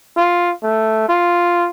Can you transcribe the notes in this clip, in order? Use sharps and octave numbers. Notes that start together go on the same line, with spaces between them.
F4
A3
F4